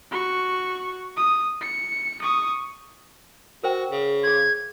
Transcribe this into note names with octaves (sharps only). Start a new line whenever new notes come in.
F#4 C#6
D#6
C#7
C#6 D#6
F#4 A#4 C5 G5
C#3
G#4 C6 G#6